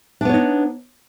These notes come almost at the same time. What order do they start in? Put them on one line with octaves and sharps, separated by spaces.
D4 B3 C#5 D#4